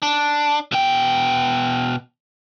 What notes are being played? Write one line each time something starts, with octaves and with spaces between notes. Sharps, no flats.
D4
B2 G5